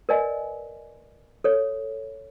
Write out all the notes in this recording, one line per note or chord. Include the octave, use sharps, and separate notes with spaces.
A#4 B4 D5 D#5 G#5
A4 C#5